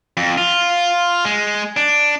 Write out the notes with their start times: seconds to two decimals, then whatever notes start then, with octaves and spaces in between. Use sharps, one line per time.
0.17 F2
0.38 F4
1.25 G#3
1.77 D4